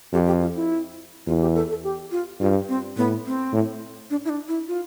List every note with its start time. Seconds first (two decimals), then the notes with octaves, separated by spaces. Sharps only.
0.13 F2 G4
0.27 G4
0.41 F4
0.55 E4
1.27 E2 F4
1.42 G4
1.55 A4
1.70 A4
1.84 G4
2.11 F4
2.40 G2 F4
2.69 C4
2.97 A2 B3
3.26 C4
3.53 A2
4.10 D4
4.25 E4
4.29 D4
4.48 E4
4.68 F4